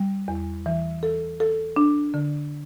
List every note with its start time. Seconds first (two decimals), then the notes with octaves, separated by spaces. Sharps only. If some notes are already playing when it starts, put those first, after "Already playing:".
Already playing: G3
0.28 E2
0.66 E3
1.03 A4
1.40 A4
1.76 D4
2.14 D3